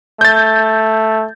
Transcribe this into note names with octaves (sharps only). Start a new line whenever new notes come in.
A3 G6 A6